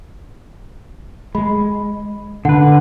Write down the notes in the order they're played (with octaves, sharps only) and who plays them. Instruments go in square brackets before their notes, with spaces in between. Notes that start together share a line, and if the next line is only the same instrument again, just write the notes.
[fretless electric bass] G#3 [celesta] B5
[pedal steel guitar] D3 B4 [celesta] F#5